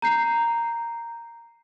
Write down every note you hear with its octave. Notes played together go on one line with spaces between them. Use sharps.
A#5 G6 C7